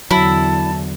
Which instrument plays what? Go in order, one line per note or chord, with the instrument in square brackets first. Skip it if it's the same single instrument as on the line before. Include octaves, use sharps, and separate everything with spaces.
[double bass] E2 D3 [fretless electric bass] F#3 [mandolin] E4 [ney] A5